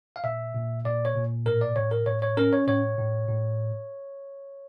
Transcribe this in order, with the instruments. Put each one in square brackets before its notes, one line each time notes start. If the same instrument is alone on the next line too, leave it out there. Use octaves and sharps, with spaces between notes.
[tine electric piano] F5
A#2 E5
A#2
A#2 D5
C#5
A#2
A2 A#4
D5
A2 C#5
A#4
A2 C#5
C#5
C#4 A#4
C#5
A2 C#5
A2
A2